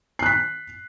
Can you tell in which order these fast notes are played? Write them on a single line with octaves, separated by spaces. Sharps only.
C7 F#6 B6